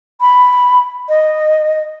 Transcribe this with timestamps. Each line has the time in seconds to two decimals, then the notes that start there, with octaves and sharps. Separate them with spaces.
0.21 B5
1.09 D#5